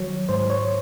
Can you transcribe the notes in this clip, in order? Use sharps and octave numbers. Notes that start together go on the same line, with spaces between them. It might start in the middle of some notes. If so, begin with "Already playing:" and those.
Already playing: D#3 F#3 C#5
G#2 C5
C#5